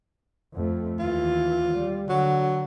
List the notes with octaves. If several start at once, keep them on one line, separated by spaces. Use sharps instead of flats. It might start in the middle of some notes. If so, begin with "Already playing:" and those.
F2 A3
D#2 E3 F4
G3
D3 F#3